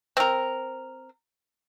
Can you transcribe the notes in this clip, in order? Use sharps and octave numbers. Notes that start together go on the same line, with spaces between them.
C4 A#4